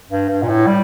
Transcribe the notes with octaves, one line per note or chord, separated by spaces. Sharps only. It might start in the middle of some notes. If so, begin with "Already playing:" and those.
G2
G2
A#2
A2
G3